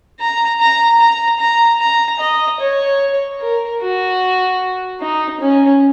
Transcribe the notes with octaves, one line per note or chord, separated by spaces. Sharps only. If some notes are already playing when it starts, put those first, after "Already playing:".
A#5
A#5
A#5
A#5
A#5
D#5
C#5
A#4
F#4
D#4
C#4